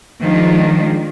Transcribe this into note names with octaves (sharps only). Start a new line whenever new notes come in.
D#3 F3 G#3 D4